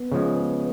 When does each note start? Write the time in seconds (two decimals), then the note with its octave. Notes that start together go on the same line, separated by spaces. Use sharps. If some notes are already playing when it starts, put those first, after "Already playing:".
Already playing: B3
0.12 C#3 F3 G#3